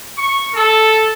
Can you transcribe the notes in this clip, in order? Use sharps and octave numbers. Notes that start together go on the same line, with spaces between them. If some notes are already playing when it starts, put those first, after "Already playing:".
C#6
A4